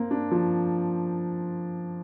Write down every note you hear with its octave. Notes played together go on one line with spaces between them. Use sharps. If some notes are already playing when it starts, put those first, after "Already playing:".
Already playing: A#3 C4
D4
F3